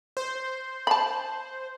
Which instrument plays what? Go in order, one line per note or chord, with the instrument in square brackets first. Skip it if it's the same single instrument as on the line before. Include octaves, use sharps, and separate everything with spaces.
[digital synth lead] C5
[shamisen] A5 B5